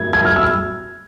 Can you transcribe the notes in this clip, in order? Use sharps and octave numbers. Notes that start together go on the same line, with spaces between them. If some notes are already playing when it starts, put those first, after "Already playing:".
Already playing: G#6
G#6
F6
E6